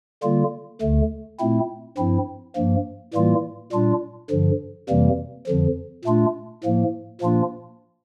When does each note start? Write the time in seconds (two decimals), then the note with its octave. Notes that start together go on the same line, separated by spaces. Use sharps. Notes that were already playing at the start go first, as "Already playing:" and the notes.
0.23 D3 G3 A#3 F4
0.81 D2 D3 A3
1.39 A#2 A3 C4 E4
1.98 G2 F3 C4 E4
2.56 G2 F3 A#3
3.14 A2 E3 G3 A#3 F4
3.72 A#2 G3 D4 F4
4.31 G2 D3 F3
4.89 F2 C3 E3 G3 A#3
5.47 F2 D3 F3
6.05 A#2 A3 D4 F4
6.64 A2 F3 A#3
7.21 A#2 F3 A#3 D4 F4